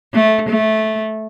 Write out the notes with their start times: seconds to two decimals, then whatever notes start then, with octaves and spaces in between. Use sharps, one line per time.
0.14 A3
0.49 A3